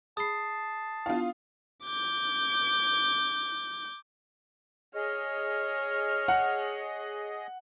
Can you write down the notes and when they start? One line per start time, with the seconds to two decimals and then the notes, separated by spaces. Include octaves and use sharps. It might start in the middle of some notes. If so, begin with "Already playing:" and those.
0.17 G#4 A5 B5 D#6 C7
1.06 B3 D4 E4 F4 F5
1.84 D6 G6
4.95 G#4 C#5 D#5 F6
6.28 F#5